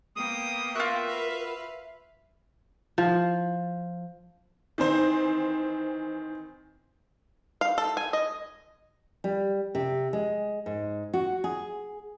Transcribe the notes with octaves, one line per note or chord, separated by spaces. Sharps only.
A#3 B3 G5 D#6
F4 F#4 A#4 E5
B4 F5
E5
F3
D#3 E3 C4 C5
F5
A4
G#5
D#5
G3
C3
G#3
G#2
F#4
G#4